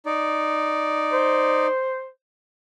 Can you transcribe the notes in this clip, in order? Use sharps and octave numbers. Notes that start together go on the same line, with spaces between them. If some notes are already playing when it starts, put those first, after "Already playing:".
D#4 D5
C5